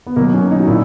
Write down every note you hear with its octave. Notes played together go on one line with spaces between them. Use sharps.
B3
B2 F#3 A#3
C#4
D#4
F#4
A#2 E4